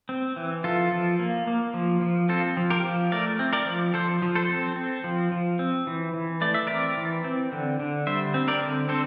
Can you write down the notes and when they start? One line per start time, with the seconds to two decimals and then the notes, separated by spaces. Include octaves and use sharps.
0.09 C4
0.36 E3
0.64 F3 F4 A4
0.92 F3
1.19 A#3
1.47 A#3
1.74 F3
2.01 F3
2.29 C4 F4 A4
2.57 F3
2.70 G4 A#4
2.84 F3
3.12 A3 A#4 D5
3.39 C4
3.53 A#4 D5
3.67 F3
3.94 F3 A4 C5
4.22 F3
4.35 A4 C5
4.49 C4
4.76 C4
5.04 F3
5.32 F3
5.59 C4
5.87 E3
6.14 E3
6.41 A3 D5
6.54 E5
6.67 C4 A#4 D5
6.97 E3
7.24 C4
7.52 D3
7.79 D3
8.07 G3 C5 E5
8.34 C4
8.48 A#4 D5
8.61 D3
8.89 C4 A4 C5